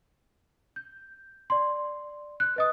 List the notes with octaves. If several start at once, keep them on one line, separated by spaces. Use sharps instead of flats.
G6
D5 C6
F#6
B4 D#5 D#6